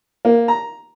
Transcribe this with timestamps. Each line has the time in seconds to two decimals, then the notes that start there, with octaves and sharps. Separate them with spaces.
0.25 A#3
0.48 A#5